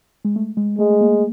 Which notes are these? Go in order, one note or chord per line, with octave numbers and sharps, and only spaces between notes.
G#3
A3
G#3
G#3 A3
A3
A#3